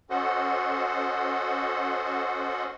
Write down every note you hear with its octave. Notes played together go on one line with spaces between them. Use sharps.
C#4 F#4 A4 C5 D#5 F#5